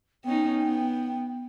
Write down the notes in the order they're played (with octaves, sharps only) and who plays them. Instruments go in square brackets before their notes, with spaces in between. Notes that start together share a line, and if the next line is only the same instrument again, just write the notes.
[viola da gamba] B3 C#4 D#4 [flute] G5
[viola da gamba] B3